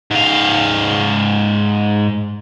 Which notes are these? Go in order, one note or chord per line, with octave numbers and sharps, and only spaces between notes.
G#2 F5